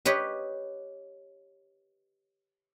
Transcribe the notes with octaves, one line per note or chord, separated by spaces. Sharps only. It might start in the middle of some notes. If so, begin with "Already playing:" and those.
G4 B4 C#5 D#5